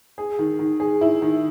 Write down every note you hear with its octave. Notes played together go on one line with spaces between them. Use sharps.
G#4
D#3
D#3
G#4
E4
D#3